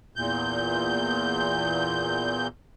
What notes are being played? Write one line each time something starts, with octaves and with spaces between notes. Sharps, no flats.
E2 A#2 G6